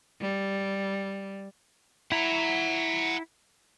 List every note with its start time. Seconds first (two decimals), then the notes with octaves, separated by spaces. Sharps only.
0.21 G3
2.12 E4 F#5 A#5